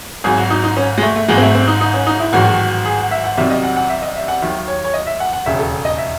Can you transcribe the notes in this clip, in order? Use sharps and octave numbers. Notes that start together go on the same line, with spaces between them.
G#1 G#2 F#3 G#4
F#4
D#4
D#4
C#4
G#3
A3
A3
G#1 G#2 F#3 G#3
C4
A3
C4
D#4
D#4
C#4
D#4
E4
A1 G#2 D#3 F#3 F#4
G#4
F#5
E5
F#5
C2 C3 D#3 F#3 E5
D#5
F#5
F#5
E5
D#5
E5
F#5
D#2 D#3 F#3 E5
C#5
C#5
D#5
E5
F#5
F#5
E1 D#2 C#3 E5
A4
D#5
E5